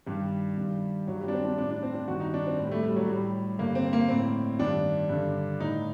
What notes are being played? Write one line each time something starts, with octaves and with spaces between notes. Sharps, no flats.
G2 D#3 G3
G2 D#3
G2 D#3 F#3
G3
D4
C4
D4
A2 D4
D4
C4
D4
G2 D#3 F#4
D#4
D4
C4
A2
G3
A3
G3
F#3
A2 G3
G2 D3 A#3
C4
A#3
A2 C4
G2 D#3 D4
G2 D3
A2 D#4